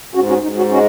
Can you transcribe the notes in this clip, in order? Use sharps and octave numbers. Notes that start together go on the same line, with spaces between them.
G#2 C#4 F#4
C#4 F#4
G#2 D#4
C#4 F#4
G#3 C#4 F#4